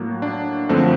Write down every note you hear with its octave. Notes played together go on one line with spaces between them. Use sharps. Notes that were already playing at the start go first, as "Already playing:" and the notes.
Already playing: A2 F#3 A#3
D4
F#2 D3 F3 A3 C4